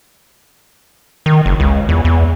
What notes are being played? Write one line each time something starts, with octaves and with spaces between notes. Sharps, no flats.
D#3
F#1
C#2
E2
E2